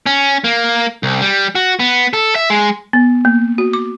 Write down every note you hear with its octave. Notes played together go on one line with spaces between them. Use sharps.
C#4
A#3
C2
G3
F#4
B3
A4
E5
G#3
B3
A#3
F#4
D6